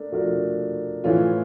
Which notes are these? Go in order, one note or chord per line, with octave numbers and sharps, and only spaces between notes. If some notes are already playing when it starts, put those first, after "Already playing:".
Already playing: A3 D4 A#4
F3 A3 D4 F#4 A#4
A2 E3 A3 C#4 F4